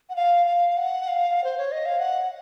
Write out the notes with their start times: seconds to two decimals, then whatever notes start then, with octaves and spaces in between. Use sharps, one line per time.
0.09 F#5
0.16 F5
0.46 F5
0.77 F#5
1.08 F5
1.44 C5
1.58 C#5
1.71 D#5
1.85 F5
1.99 F#5